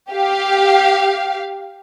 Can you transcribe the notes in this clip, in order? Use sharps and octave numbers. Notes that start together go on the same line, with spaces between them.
G4 F5